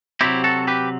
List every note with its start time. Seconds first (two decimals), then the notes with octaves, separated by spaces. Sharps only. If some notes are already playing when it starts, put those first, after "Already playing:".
0.21 C3 F#3 C4 E4 G4
0.44 F#4 A4
0.68 G4 B4